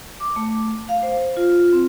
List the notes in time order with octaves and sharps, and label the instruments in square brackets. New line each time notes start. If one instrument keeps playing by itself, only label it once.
[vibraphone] D6
A3
F5
C5
F4
C4